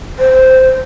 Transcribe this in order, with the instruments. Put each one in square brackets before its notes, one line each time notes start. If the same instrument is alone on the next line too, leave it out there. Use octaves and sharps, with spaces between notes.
[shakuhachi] C5